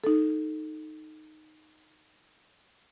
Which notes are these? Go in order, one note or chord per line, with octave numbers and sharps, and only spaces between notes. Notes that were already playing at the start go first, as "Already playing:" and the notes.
D#4 A4